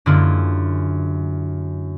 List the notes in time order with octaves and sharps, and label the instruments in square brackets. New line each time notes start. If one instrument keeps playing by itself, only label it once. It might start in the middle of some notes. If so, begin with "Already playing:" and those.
[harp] F#2 D3 G#3 A#3 E4 F4